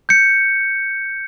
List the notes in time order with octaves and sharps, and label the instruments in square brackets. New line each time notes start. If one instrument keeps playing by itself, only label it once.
[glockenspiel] G6 C#7